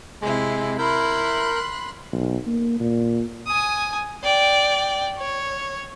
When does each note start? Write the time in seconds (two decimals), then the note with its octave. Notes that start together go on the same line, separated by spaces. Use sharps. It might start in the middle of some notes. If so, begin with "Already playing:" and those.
0.22 C3 G#3 E4
0.79 E4 A#4 B5 C6 F#6 G6
2.12 B1
2.47 A#3
2.80 A#2
3.47 G#5 D#6
4.23 D5 G5
5.17 C#5